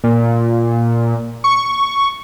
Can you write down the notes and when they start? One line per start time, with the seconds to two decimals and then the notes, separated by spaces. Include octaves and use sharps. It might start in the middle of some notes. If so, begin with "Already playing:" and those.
0.04 A#2
1.44 C#6